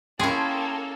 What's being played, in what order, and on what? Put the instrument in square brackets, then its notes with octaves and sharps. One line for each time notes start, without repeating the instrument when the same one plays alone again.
[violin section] A#3 A4 [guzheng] C#4 E4 [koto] G#4 [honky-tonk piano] G5 C6 G#6